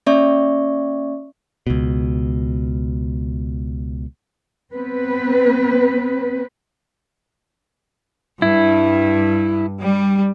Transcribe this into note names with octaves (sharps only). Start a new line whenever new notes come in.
A#3 C#4 D5 E5 C#6
C#2 B2
B3 C4 B4
G2 E4
G3